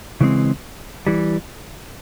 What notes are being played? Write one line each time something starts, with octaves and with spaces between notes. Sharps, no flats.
C#3 E3 G#3 C4
E3 G3